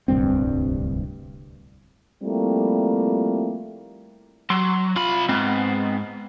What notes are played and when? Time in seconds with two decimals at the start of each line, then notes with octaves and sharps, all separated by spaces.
0.08 D1 C2 G2 C4
2.23 F3 G3 A3 A#3 C4 E4
4.50 F#3 C6
4.96 C2 F4 B5
5.29 G#2 B3 C4